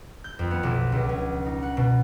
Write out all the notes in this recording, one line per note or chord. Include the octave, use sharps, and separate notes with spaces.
G6
F2
B3
B1
C#2
C#4
D#4
F#5
B2